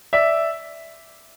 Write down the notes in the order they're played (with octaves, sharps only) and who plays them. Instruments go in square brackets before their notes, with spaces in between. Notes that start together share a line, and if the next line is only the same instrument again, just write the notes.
[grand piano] D5 E5